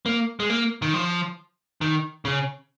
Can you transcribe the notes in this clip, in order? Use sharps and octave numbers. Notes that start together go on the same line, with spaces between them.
A#3
G#3
A#3
D#3
F3
D#3
C#3